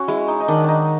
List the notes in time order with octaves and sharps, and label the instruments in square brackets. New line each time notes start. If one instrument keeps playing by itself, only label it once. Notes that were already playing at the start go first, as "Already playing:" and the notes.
Already playing: [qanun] C#4 [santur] F#4
[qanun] G#3 [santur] E4
[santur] D#4
D#4
[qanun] D#3 [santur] D4
[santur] D4 D#4